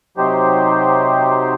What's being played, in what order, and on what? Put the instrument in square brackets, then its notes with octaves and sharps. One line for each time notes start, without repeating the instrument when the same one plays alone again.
[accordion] C3 F#3 D#4 G4 C5